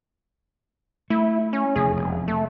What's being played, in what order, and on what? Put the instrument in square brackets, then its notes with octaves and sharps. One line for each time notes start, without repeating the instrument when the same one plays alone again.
[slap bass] A3 [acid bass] E4
[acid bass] C#4
[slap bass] F1 E2 [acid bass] G#4
[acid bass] E1
A3